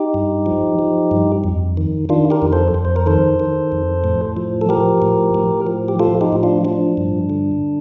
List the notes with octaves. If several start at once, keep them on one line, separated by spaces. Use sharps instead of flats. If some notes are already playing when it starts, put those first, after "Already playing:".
Already playing: D#4 G4
G2
F3
F3
G2
F2
D#3
D#3 D4 F4
G4 A#4
F2
A4 C5
F2
C5
A#4
D#3 A4 C5
D#3
F2
A2
F3
A4
F3 G4 A#4
A2
A2
F3
G4
F3 F4 A4
D#4 G4
A2
D4 F4
F3 D4
G2
D3